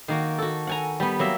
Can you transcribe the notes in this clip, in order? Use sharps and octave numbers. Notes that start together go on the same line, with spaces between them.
D#3 A#3 F#4
F#4 A4
F#5 G#5 A#5
G3 B3
F#3 A#3 E5